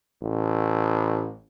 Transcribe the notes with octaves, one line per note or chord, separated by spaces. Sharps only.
A1